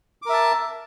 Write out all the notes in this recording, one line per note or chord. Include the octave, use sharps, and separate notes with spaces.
A#4 E5 A5 D6